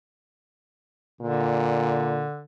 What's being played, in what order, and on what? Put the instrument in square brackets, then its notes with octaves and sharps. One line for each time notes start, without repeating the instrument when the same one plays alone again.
[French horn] A#2 [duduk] D3